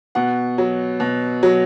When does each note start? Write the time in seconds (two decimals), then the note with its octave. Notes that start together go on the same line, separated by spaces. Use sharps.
0.15 B2 F#5
0.58 F#3
1.00 B2
1.43 F#3